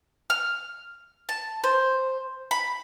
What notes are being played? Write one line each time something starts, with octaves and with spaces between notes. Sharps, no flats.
F6
A5
C5
B5